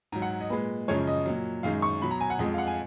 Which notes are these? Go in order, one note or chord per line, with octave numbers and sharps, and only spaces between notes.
G#2 F#3 A#5
F#5
D#5
A#2 G#3 B4
F#2 C#3 F3 G#3 C#5
D#5
A#2 F#3
F#2 D#3 G#3 F5
C#6
B2 F#3 B5
A#5
G#5
F#5
F2 F3 G#3 D#5
F5
F#5
G#5